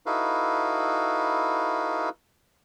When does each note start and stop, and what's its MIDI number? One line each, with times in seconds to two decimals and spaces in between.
0.06 2.09 63
0.06 2.09 64
0.06 2.09 66
0.06 2.09 69
0.06 2.09 71
0.06 2.09 77